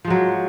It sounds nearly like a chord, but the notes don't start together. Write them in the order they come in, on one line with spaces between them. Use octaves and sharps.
F3 G#3 F#3